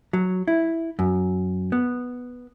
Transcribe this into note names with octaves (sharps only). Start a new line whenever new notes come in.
F#3
E4
F#2
B3